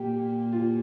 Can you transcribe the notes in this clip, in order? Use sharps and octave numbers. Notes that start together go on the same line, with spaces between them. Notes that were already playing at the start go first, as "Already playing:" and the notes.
Already playing: A#2 G4
F4